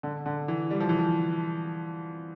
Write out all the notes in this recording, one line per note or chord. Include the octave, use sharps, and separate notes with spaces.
D3
D3
E3
G3
F3
E3
F3